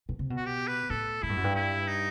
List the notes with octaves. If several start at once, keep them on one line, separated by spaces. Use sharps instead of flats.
B2
C3
B2
F#4
G4
B4
A2 A4
A2 E4
G2
F#2
G2
E4
D#4